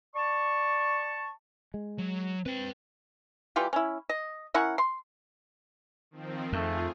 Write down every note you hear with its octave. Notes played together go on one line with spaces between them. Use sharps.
D5 A5 C#6
G#3
F#3
C4 B4 G5
E3 G3 F4 G4
C#4 E4
D#5
C#4 E4 A#4 F#5
C6
D#3 F3 C4
F2 A3 F4 G#4